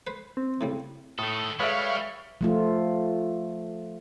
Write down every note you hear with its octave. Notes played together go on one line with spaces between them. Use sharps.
B4 C5
C4
A2 C#3 G3
A2 D#3 A3 A4 D#6
G3 G#3 A4 B4 C#5 E5 F5
F3 A3 F4